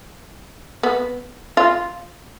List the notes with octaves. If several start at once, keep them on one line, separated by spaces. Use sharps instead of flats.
B3
F4